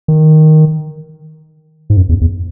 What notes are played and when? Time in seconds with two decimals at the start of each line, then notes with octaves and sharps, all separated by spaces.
0.08 D#3
1.90 G#2
1.97 F#2
2.09 E2
2.21 E2